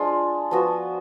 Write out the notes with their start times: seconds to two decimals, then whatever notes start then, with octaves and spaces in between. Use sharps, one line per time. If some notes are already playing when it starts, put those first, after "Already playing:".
Already playing: F3 G#3 D4 F4
0.51 F3 B3 F#4